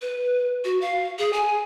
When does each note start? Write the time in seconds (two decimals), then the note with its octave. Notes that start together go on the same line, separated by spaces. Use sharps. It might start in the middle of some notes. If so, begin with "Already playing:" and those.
0.02 B4
0.65 F#4
0.81 F5
1.19 G#4
1.33 G#5